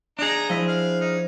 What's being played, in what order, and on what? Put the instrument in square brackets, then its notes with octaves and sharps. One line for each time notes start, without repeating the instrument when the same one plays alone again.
[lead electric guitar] D4 G#4 [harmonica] D#4 A#5
[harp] F3 E4 [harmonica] D#5
[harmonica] F5
D#4